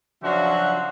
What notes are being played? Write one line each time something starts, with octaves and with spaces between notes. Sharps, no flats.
C#3 F3 F#3 D4 F#4 E5